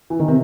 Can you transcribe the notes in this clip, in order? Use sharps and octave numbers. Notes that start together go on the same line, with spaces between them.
E3
D#3
C3